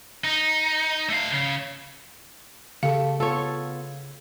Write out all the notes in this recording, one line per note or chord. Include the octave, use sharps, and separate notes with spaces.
D#4
A3 F5
C#3
C#3 A3 G4 A4 F5
B3 F4 A4 C#5